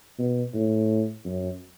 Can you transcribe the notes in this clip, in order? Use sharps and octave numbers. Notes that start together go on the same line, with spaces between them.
B2
A2
F#2